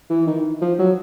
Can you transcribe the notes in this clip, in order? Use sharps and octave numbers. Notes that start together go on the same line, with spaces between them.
E3
D#3
F3
F#3